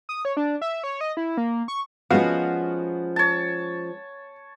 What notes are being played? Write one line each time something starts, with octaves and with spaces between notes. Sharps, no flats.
D#6
C#5
D4
E5
C#5
D#5
E4
A#3
C#6
F3 G#3 B3 C#4 F#4 F5
C#5 A5